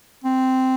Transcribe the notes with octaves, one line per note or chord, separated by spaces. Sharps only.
C4